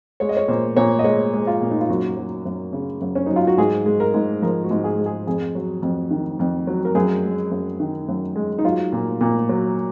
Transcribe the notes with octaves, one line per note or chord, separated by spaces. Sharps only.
G#3 C#5
D#5
C#5
A#2 C5
A#2 C#5
D#5
G#3 C#5
G#3
F4
A#2
D#4
F4
F#2 F#4
F#3
F#2
C#3
F#2
C#4
F#3 D#4
F4
F#4
G#2 G#4
G#3
A#4
G#2
F3 A#4
F#4
G#2
G#4
G#3
G#4
F2 G#4
F#3
F2
D#3
F2
F#3
A#4
F#2 G#4
G#3
F#2
D#3
F#2
G#3
D#4
F#3 F4
A#2
A#2
F#3